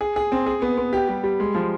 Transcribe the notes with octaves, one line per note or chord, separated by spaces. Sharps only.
G#4
G#4
C4
G#4
B3
B3
G4
G3
G3
G#3
F3